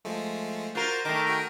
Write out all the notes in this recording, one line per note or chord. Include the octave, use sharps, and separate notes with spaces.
F3 G#3 A3
F4 F#4 A#4 C5 A6
D#3 A3 A#4 A5 D6
F#4 G5